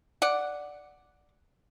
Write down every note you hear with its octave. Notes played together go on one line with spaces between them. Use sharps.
D5 F#5